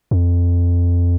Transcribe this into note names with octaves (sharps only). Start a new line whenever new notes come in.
F2